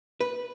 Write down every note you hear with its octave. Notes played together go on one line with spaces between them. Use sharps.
B4